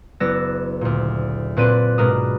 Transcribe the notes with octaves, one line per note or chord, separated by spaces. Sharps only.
F#1 B3 E4 D5 E6 A#6
D2 A#2
A#2 C4 B4 D5 D#7
G#2 B2 D4 A#4 B5 D#6